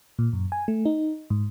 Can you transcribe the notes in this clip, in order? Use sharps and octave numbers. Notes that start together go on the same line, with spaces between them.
A#2
F#2
G#5
A3
D#4
G#2